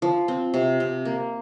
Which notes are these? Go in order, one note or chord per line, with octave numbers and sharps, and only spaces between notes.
F3
C4
C3
C3
A#3